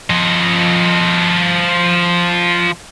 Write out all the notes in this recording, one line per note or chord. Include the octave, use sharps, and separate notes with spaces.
F3 D#5